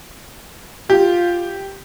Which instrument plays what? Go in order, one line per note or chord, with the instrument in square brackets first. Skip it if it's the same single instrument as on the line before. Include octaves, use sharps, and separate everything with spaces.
[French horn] F4 [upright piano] G4